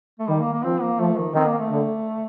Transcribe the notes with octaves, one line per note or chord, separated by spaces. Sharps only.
A3
D#3 G3
A#3
A#3
F3 C4
A#3
F3 A3
D#3
D#3 C4
A#3
A3
D3